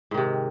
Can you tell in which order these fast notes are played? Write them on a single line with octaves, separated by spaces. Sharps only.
G#2 D#3 C3